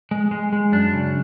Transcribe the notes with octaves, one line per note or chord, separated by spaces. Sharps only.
G#3
G#3
G#3
F#2 D4
C#3